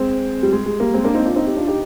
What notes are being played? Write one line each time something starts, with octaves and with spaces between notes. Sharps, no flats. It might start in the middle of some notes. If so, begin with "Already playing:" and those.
Already playing: G#3 C4
G3
G#3
G#3
G3 A#3
G#3 C4
A#3 D4
C4 D#4
D4 F4
C4 D#4
D#4 G4
D4 F4
D#4 G4